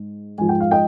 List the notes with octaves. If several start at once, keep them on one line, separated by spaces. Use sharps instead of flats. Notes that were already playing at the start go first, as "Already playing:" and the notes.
Already playing: G#2
G#2 F3 G#5
G5
F5
D#5 G5